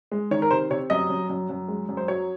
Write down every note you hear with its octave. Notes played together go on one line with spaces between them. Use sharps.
G#3
D#3 C#5
A#4
C3 C5
C3 C#5
F#2 D#5
F#2
F#2
F#2
G#3
F#2
C5
F#3 C#5